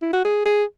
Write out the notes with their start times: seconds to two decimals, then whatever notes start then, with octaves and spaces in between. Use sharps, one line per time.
0.02 E4
0.13 F#4
0.25 G#4
0.46 G#4